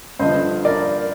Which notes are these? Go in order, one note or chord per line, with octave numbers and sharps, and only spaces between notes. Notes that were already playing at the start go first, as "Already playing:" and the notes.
G2 D3 F3 C5 D#5
A#4 D5